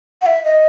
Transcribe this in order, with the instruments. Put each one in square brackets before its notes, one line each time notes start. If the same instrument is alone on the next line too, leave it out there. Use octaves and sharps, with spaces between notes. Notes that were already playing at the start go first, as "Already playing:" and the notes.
[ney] F#5
E5
D#5